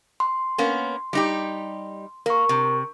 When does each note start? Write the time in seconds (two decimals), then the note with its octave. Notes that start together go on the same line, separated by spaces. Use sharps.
0.20 C6
0.58 A#3 B3 C#4
1.13 G3 D#4 G4
2.26 A#3 A#4 C#6
2.49 C3